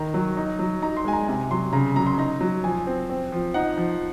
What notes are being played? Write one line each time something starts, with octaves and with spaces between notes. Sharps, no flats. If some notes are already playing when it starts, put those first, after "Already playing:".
Already playing: D#3 A#5
F#3
D#4
F#3
D#4 A#5
C6
G#3 G#5
A#5
C3 G#5
F#3 C6
C#3 A#5
F#3 A#5
C6
D#4 A#5
F#3
F3 G#5
C4
C4
F3
D#4 F#5
F3